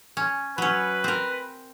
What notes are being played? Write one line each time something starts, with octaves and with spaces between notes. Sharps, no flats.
C#4
F#3 C#4 B4
C4 A#4